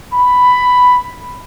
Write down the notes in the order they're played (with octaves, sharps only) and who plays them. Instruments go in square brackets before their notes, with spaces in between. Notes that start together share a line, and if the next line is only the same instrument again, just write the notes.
[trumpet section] B5